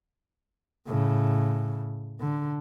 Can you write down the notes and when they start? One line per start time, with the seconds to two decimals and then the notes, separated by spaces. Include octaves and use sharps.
0.88 A2 C#3
2.20 D3